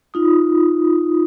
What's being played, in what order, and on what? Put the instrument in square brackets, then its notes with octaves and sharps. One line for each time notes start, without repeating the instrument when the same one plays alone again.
[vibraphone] D#4 F4 D#6